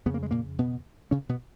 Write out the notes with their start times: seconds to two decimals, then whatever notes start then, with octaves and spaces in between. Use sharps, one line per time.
0.06 F2 C#3 B3
0.14 A#3
0.23 G#3
0.31 A#2 A#3
0.59 B2 B3
1.11 C#3 C#4
1.29 B2 B3